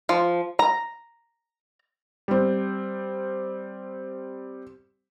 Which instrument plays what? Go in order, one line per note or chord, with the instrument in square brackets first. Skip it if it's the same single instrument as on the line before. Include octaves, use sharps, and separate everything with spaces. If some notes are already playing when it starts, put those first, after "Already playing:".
[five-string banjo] F3
A#5
[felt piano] G3 C4